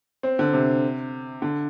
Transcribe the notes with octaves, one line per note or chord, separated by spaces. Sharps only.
C4
D3
C3
D3